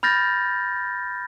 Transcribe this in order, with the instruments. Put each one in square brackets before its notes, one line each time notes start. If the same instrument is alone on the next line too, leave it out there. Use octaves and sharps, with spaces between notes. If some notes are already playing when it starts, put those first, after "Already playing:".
[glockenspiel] B5 F6 G6 A6 A#6